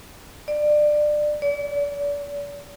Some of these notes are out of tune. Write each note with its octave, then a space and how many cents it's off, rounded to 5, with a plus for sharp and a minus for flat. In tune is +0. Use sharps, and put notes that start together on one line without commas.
D5 +20
D5 -40